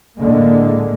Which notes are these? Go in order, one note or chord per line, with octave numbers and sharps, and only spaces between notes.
A2 D3 G#3 A#3